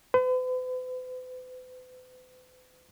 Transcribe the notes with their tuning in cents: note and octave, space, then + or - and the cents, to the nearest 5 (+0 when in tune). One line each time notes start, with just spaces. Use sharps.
B4 +45